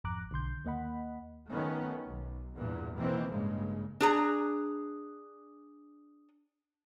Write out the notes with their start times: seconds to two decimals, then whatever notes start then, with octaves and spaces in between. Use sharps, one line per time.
0.04 G#1 F2 A#5 D6 F#6
0.31 B1 D3 C6 G6
0.65 D#2 A#3 D#5 F#5 B5
1.50 D#3 F#3 A3 B3 C#4
2.06 B1
2.58 E2 G2 A#2 E3
2.97 B2 D#3 E3 A#3 C4
3.31 A1 G2 C#3 G#3 A#3
4.01 D4 G#4 A#5